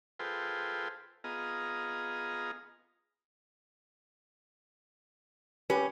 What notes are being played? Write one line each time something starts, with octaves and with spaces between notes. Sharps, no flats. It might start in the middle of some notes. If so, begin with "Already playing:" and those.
F4 G#4 A4 B4 C5 G5
B3 F4 G#4 D#5 A#5
C#4 G4 B4